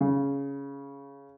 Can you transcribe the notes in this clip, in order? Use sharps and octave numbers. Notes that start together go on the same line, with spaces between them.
C#3